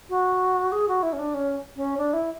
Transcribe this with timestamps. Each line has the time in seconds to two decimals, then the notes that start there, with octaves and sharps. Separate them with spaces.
0.10 F#4
0.72 G#4
0.88 F#4
1.03 E4
1.13 C#4
1.19 D4
1.34 C#4
1.76 C#4
1.98 D4
2.13 E4